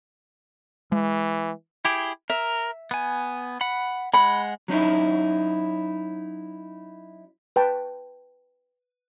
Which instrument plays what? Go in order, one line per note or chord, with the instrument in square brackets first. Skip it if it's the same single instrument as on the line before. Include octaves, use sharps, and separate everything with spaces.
[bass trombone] E3 [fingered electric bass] G#3
[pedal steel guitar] E4 G4 G#4
[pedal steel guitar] A#4 [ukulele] E5
[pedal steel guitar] B3 G#5
F#5 B5
[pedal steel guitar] G#3 F#5 [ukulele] B5
[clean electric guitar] F#3 C#4 D#4 E4
[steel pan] B4 G5 A5